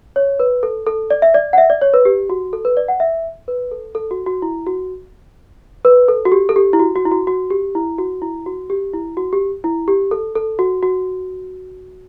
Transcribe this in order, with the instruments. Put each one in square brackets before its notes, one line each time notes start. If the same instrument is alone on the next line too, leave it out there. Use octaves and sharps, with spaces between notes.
[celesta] C#5
B4
A4
A4
D5
E5
D5
F#5
E5
D5
C#5
B4
G4
F#4
A4
B4
D5
F#5
E5
B4
A4
A4
F#4
F#4
E4
F#4
B4
A4
F#4
G4
A4
G4
E4
F#4
F#4
E4
F#4
F#4
G4
E4
F#4
E4
F#4
G4
E4
F#4
G4
E4
G4
A4
A4
F#4
F#4